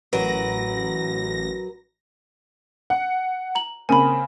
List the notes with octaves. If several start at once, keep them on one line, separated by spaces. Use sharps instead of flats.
A1 F#3 A#4 B4 A#6
F#5
A#5 F#7
C#3 A#3 C4 G#5 B5